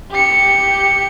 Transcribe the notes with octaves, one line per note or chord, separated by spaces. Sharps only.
G4 C#7